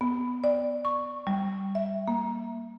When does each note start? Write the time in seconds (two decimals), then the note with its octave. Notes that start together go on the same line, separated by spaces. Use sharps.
0.01 B3
0.44 D5
0.85 C#6
1.27 G3
1.75 E5
2.08 A#3